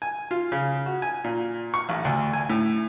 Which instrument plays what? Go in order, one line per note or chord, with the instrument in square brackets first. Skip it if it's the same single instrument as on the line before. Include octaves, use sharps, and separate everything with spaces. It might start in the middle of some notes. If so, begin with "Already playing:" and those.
[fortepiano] G#5
F4
C#3
F#4
G#5
A#2
C#6
A1
D2
G#5
A2